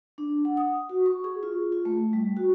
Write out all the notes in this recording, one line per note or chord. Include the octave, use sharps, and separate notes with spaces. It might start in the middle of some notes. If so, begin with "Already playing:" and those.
D4
F#5
D#6
F#4
C#6
G#4
F4
F4
A3
G3
F#4